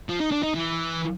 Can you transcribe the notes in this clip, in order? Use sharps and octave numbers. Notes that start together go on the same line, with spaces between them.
F3
D#4
D4
D#4
E3